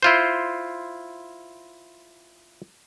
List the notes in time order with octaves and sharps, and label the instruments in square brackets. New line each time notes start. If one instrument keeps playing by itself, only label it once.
[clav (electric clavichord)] E4 F4 C5